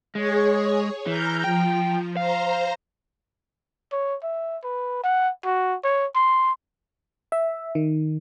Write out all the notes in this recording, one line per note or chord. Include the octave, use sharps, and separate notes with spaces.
G#3 G#4 C#5
E3 A#5 F6 G6
F3 G5
C5 F5 A#5
C#5
E5
B4
F#5
F#4
C#5
C6
E5
D#3